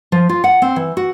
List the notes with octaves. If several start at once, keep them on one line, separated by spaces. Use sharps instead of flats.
F3
F4
F#5
C4
E3
F#4